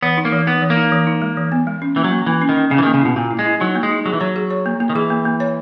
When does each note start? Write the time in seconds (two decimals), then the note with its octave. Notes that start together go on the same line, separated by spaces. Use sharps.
0.03 E3 B3
0.17 D#4
0.25 A#3
0.32 E3
0.47 B3 D#4
0.62 E3
0.70 A#3
0.77 D#4
0.92 E3
1.07 D#4
1.22 G#3
1.37 E3
1.52 B3
1.67 G#3
1.82 C#4
1.96 E3 A#3
2.04 F#3
2.12 A#3
2.26 E3 A#3
2.42 C#4
2.49 D#3
2.56 C#4
2.71 C#3 C#4
2.78 E3
2.83 D#3
2.86 A#3
2.94 C#3
3.01 B2 E4
3.16 A#2 A#3
3.31 E4
3.39 G#3
3.46 E4
3.61 F#3 D#4
3.75 A#3
3.83 G#3
3.91 D#4
4.06 F#3 G#4
4.13 E3
4.20 F#3 C#5
4.36 G#4
4.50 C#5
4.66 A#3
4.80 A#3
4.90 D#3
4.95 E3 G#4
5.10 A#3
5.25 A#3
5.40 C#5